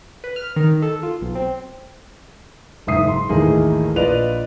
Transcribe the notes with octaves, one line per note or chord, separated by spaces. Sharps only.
B4
F6
D#3
A4
F4
B1
C4
F#1 G#2 E5 D#6 C7
C6
A1 D#2 A3 D#4 G#4 D#5
A#1 F4 B4 D5 D#5 F7